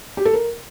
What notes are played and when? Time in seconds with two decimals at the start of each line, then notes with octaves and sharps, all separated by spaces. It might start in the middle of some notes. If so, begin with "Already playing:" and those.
0.17 G4
0.25 A4
0.34 A#4